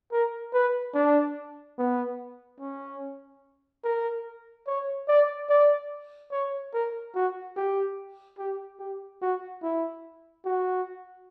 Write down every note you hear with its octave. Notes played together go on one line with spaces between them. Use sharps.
A#4
B4
D4
B3
C#4
A#4
C#5
D5
D5
C#5
A#4
F#4
G4
G4
G4
F#4
E4
F#4